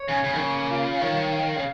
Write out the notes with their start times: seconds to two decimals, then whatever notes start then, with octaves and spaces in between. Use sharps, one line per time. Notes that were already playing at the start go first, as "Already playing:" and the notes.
Already playing: C#5
0.08 C#3 G#5
0.24 C#3
0.34 D#3
0.39 C#3 A#3
0.70 F4
1.01 D#3 C#5
1.32 F5
1.56 C#3